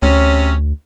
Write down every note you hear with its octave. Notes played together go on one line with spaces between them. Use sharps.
D2 C3 C#4